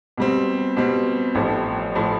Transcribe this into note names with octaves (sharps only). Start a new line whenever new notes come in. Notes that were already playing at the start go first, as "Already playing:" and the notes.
B2 G3 C4
B2 G3 C4
A1 A2 F3
A2 F3